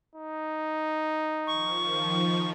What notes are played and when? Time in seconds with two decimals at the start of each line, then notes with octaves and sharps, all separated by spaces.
0.15 D#4
1.47 D#3 F3 C#6